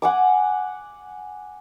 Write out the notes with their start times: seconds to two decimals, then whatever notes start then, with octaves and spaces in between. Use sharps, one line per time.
0.02 F#5 G#5 D6